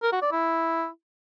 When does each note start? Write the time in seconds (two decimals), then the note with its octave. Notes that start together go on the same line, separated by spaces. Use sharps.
0.03 A#4
0.12 F#4
0.22 D5
0.32 E4